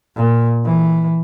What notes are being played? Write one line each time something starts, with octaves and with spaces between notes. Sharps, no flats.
A#2
E3